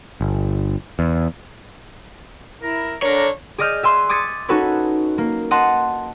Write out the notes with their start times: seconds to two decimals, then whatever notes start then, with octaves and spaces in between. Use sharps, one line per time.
0.21 G1
0.99 E2
2.61 E4 A#4
3.02 D3 D4 A#4 C#5
3.58 G#4 D5 D#5 D#6 F6 G6
3.83 E5 G#5 C6 E6 F#6
4.09 D6 D#6 G#6 A6 B6 C#7
4.49 C#4 D#4 F#4 A4 B4 C#5
5.18 A#3
5.51 D#5 F#5 A5 C6